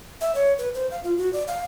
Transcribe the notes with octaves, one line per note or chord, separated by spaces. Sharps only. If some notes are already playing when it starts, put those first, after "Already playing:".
E5
C#5
B4
C5
F5
F4
F#4
D5
F5